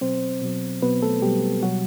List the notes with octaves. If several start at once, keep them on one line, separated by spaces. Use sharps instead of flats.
B2 F#3 C4 C5
B2 F#3
B2 F#3 B3 B4
A3 A4
B2 F#3 G3 G4
B2 F#3 G3 F#4